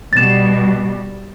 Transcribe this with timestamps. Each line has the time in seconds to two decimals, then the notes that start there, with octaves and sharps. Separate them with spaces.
0.13 B2 G3 A6 E7